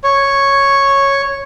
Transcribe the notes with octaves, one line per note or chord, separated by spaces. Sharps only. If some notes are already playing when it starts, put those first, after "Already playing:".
C#5